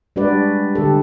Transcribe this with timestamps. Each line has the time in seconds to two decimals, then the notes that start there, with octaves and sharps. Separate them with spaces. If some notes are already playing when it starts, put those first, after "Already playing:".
0.16 G3 G#3 D4 F#4 B4 D5
0.75 D3 G4 A4